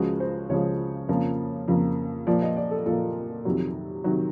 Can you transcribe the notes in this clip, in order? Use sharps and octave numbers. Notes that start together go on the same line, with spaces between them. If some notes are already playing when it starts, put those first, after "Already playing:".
Already playing: C#2 C#3 F3 G#3 F#4
C5
C#2 C#3 F3 G#3 C#5
F2 C#3 F3 A#3
F2 C#3 F3 A#3
A#2 F3 A#3 D5
D#5
D5
A4
A#2 F3 A#3 A4
F2 C3 D#3 F#3
C3 D#3 F#3